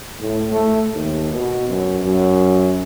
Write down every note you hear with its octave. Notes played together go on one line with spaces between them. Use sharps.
A2
A3
D#2
B2
F#2
F#2